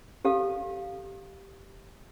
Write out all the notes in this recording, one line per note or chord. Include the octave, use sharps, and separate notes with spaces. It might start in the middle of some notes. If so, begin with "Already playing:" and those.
G4 A4 F5